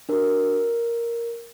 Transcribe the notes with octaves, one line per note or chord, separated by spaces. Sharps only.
D4 F#4 A#4